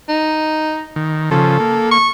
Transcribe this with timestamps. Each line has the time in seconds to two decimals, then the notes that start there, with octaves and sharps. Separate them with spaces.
0.09 D#4
0.96 D#3
1.31 C#3 F3 A4
1.60 A#3
1.91 C#6